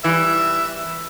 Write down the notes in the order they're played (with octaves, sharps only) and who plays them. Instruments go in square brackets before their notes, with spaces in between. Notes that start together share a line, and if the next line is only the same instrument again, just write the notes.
[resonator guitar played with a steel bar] E3 G3 [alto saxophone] E5